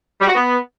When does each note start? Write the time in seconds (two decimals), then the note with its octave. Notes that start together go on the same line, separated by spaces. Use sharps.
0.20 G3
0.28 F#4
0.35 B3